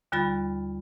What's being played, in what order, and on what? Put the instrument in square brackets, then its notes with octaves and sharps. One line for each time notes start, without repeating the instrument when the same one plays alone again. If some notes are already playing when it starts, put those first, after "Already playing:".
[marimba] D#2 D3 G3 F4 B5 A6